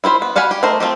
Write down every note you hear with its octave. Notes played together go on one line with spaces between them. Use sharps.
E4 F4 C5 B5
B3
F#4 F5 F#5 G#5 B5
G4
A3 A#4 C5 D#5
A3 C4 F4 G4